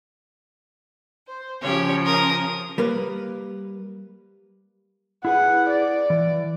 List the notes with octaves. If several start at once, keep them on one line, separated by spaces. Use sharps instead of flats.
C5
C#3 F3 G4 C#5
A#4 D#6
G3 A#3 B4
E4 G#4 B4 F#5
D5
E3